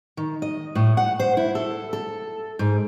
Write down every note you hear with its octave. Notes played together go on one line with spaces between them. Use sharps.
D#3
D#5
A2
F#5
C5
E4
A4
A4
G#2